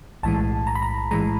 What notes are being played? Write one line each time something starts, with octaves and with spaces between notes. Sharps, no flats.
B1 A2 E3 G#3 A5
A#5
B5
A#5
A2 E3 G#3 A#5